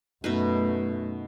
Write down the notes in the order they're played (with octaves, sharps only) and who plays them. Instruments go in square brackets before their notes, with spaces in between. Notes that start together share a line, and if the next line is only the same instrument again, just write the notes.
[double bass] F#2 A3 [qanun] B2 D#4 B4